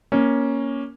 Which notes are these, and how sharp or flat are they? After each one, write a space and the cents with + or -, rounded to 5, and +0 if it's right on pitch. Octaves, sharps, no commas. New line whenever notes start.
A#3 +15 C#4 +0